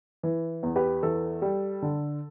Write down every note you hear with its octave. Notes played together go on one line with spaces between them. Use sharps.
E3
E2
G4 B4
E3 A4
G3
D3